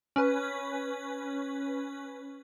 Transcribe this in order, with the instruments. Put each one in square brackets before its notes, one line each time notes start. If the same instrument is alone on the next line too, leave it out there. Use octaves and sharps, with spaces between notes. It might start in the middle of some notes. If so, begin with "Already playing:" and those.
[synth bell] C#4 B4